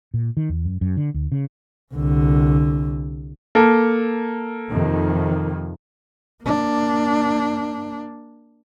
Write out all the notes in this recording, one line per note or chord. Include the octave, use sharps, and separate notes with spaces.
A#2
D#3
E2
F#2
F#2
D3
D2
C#3
C2 D3
A#3 A4
F2 C3 D#3
A#3 D4